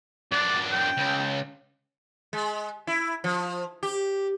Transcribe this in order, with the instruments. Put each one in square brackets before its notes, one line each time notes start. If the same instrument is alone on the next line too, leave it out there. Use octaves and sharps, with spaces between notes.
[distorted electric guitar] F#2 D4 [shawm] D5
[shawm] G5
[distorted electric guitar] C#2
[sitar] G#3
E4
F3
G4